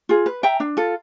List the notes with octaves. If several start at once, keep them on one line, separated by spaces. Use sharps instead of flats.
F4 G#4
B4
E5 G5 A#5
D4
F4 A4